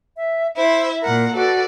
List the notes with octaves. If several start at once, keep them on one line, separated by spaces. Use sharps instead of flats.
E5
E4 C5 E5
A#2 A#4 F#5 A#5
F#4 A4 B4 D5